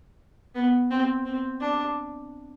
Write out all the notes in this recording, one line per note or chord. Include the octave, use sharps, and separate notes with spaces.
B3
C4
C4
D4